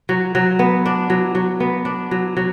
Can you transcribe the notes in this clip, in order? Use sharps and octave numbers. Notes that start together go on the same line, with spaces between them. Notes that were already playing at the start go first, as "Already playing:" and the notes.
F#3
F#3
B3
D4
F#3
F#3
B3
D4
F#3
F#3